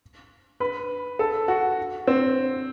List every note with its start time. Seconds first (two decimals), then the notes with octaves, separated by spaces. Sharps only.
0.60 B4
1.19 A4
1.48 F#4
2.07 C4